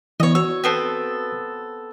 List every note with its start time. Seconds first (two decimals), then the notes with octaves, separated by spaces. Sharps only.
0.20 E3 B3 C#5 D#5
0.35 F#4 C#5 E6
0.64 B3 C4 A4